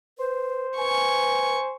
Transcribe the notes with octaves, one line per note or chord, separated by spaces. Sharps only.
B4 C5
B4 G#5 C#6